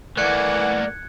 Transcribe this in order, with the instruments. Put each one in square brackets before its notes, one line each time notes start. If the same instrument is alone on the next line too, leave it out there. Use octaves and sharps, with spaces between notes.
[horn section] E3 F#5 [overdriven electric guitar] A3 A#3 [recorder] D5 [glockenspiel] F#6 G#6 C#7